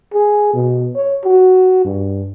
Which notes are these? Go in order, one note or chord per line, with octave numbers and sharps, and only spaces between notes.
G#4
B2
C#5
F#4
G2